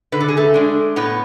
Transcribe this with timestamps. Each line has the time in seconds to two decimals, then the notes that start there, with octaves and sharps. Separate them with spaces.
0.12 D3 B4
0.20 A4
0.28 G#4
0.37 A3 A4
0.54 G#3 D4
0.96 A2 B3 B4